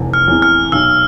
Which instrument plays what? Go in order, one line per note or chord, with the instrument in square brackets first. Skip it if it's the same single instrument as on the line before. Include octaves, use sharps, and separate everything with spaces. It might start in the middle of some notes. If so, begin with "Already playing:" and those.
Already playing: [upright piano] F1 E2 C3 E3
[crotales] F6
[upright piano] E2 C3 E3
[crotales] F6
[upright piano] B1 [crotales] E6